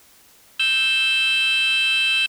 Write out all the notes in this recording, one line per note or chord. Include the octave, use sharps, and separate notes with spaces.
E6 G6